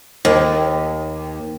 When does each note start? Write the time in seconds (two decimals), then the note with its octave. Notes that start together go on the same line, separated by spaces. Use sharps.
0.25 D#2